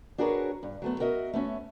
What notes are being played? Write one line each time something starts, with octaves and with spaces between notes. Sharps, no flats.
D4 F#4 G#4 A#4 B4 C#5
G2
F#3 A3 B3
F#4 A#4 D#5 E5
A3 B3 C#4